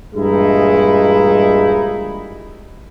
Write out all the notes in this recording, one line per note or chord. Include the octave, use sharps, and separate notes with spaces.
G2 A#2 E3 G#3 D#4 E4